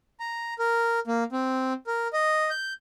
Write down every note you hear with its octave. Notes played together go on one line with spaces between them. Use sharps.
A#5
A#4
A#3
C4
A#4
D#5
G6